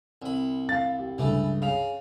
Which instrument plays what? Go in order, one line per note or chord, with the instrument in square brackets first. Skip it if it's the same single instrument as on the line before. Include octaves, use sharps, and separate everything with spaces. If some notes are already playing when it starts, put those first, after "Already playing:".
[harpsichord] C2 B5
[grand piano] F5 A6
G4
[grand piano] C#2 G2 [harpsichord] E3 A3
[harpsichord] C#3 [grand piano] F5 F7